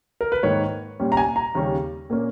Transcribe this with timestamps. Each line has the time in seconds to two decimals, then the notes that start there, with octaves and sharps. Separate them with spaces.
0.21 A#4
0.32 B4
0.43 G#2 D#3 A#3 C#5
1.00 A#2 G3 C#4
1.12 A#5
1.17 G#5
1.36 A#5
1.55 D#2 C#3 G3 C#4
2.10 A#2 A#3 C#4